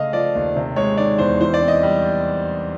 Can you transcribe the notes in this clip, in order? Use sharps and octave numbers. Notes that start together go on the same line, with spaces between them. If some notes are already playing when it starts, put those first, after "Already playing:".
Already playing: C#3 A3 D#5 F5
F3 D5
D#2
C3
G#3 C#5
D#3 D5
E2 C5
E3 C5
D5
C4
D#5
G3